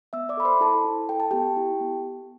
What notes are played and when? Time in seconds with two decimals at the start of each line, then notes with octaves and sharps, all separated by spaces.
0.13 B3 E5 E6
0.29 D5 D6
0.37 A4 B5
0.45 C5 C6
0.61 E4 A4 A5
0.84 E4
1.09 A4 G5
1.20 A5
1.31 B3 G4 G5
1.57 E4
1.81 B3